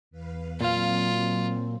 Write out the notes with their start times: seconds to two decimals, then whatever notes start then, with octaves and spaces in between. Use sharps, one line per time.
0.11 E2 B4 F5
0.61 A#2 F#3 C4 F4 F5